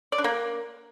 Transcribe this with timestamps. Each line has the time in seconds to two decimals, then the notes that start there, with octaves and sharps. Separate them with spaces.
0.12 D5
0.18 D4
0.24 A#3